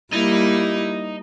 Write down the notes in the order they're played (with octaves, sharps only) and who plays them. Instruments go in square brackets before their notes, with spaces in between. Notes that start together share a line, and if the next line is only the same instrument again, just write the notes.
[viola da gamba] G3 A#3 [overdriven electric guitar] D#4 [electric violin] E4